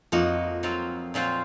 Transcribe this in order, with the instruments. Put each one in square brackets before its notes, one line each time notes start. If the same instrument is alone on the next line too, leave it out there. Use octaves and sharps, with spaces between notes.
[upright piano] F2 [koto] F3 A#3 D#4 F#4
[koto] F#3 C4 F4
A#2 F#3 C4 F4 C5